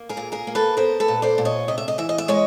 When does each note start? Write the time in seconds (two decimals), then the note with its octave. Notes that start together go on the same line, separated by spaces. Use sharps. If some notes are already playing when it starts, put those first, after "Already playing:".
Already playing: A#3
0.09 G#4 A#4
0.17 A#2
0.32 G#4 A#4
0.47 A#3
0.55 A4 B4
0.77 B3 A#4 C5
1.00 A4 B4
1.08 A#2
1.22 C5 D5
1.38 A#2
1.45 C#5 D#5
1.68 C3 D#5
1.78 E5
1.88 D#5
1.98 E3 E5
2.09 D#5
2.18 E5
2.28 G#3 C#5 D#5